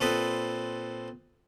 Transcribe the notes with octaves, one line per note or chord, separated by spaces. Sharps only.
A#2 C4 A4 B4 B5 D#6